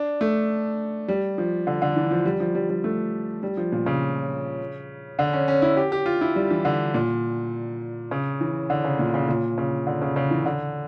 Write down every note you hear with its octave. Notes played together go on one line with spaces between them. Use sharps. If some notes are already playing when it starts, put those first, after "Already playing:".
Already playing: D4
A3
G3
F3
D3
D3
E3
F3
G3
F3
G3
G3
A3
G3
F3
A#2
C#3
D3
C#4
C#4
E4
G4
G4
F4
E4
G3
E3
D3
A#2
C#3
E3
D3
C#3
A#2
C#3
A#2
C#3
D3
C#3
C#3
E3
D3